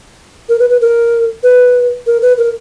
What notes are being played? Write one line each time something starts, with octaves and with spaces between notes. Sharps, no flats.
A#4
B4
B4
A#4
B4
A#4
B4
A#4